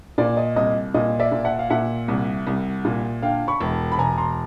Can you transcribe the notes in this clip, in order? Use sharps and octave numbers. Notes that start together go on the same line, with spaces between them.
A#2 D5
D#5
C2 D#5
A#2 D#5
D5 E5
A#2
E5 F#5
F5
A#2 E5 F#5
C2
C2
A#2
D3 F5 G5
B5 C#6
E1
B5
E1 G#5 A#5
A#5 C6